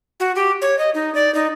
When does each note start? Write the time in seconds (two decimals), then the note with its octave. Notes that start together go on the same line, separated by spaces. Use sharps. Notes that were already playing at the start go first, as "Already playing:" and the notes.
0.20 F#4
0.36 G4
0.62 C#5
0.79 D#5
0.94 D#4
1.15 D5
1.35 D#4